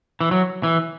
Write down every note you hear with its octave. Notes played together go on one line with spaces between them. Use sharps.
E3
F#3
E3